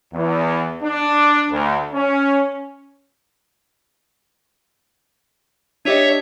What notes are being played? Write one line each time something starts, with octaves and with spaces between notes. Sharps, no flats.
E2
D4
D2
C#4
D4 G4 C#5 D#5 E5